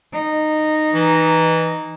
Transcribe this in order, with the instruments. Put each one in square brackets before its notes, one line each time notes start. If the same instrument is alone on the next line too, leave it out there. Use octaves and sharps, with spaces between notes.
[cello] D#4
[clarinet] E3 [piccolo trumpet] A#5